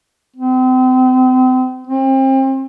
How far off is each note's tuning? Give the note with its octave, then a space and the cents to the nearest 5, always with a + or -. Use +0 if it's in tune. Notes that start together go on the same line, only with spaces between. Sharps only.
C4 -35
C4 +30